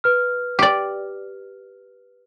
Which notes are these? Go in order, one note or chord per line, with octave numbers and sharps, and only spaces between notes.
B4 F6
G4 D5